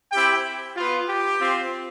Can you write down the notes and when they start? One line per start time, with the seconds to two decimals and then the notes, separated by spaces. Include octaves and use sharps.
0.12 C4 E4 G4 G5
0.76 B3 F4
1.08 G4
1.40 C4 F4